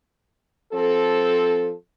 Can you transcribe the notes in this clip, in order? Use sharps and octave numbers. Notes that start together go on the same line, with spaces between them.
F3 C4 A4